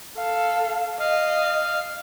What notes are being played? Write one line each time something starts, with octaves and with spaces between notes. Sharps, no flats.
A4 F5
D#5 F5